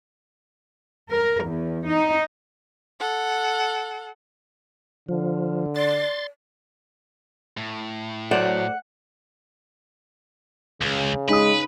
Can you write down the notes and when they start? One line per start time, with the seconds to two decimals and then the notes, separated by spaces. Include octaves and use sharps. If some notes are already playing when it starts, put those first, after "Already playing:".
1.10 A#4
1.44 E2
1.87 D#4
3.00 A4 F#5
5.09 D3 F3
5.76 D5 C6 A6
7.57 A2
8.31 F#3 A4 C5 D5 F#5
10.81 C#2 C#3
11.28 G#3 D#4 B4 D#6